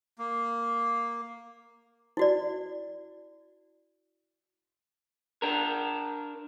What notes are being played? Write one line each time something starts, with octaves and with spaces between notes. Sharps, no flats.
A#3
E4 F#4 D5
D4 A#4